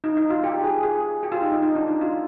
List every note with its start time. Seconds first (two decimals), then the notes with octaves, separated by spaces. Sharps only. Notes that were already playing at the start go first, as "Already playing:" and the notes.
0.04 D#4
0.17 D#4
0.30 F4
0.44 G4
0.64 G#4
0.83 G#4
1.23 G4
1.32 F4
1.42 D#4
1.52 D#4
1.62 D#4
1.75 D4
1.88 D#4
2.01 F4